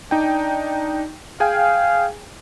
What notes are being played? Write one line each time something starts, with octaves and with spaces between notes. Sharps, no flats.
D4 D#4 G5
G#4 F5 G5 G#5